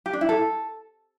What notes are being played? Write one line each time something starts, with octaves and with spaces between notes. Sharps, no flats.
G4
D4
E4
A4